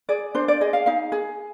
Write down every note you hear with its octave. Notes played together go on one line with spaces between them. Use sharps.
G#4 D5
D4 C5
D5
G#4 D#5
F5
D#4 F5
G#4